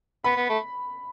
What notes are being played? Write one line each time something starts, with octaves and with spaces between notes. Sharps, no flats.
B3 B5
B3
A3